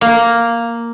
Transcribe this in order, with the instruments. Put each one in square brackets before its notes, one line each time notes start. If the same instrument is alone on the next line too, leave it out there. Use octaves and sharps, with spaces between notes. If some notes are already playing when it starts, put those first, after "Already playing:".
[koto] A#3